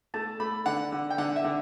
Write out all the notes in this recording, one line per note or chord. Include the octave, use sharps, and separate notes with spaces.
A3 A5
A3 B5
D3 F#5
D3
G5
D3 F#5
E5
D3